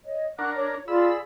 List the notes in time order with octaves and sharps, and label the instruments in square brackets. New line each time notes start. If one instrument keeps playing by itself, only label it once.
[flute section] C#5 D#5
[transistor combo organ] D4 A#4 [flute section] F#5 C#6 F#6
[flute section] C#5
[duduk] F4 [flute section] G#4 D5 F5 [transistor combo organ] B5 E6